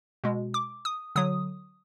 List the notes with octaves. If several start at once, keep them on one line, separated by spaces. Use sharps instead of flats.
B2 G#3
D6
D#6
D3 F#3 D#6